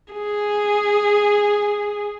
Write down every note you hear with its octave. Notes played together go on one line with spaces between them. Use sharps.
G#4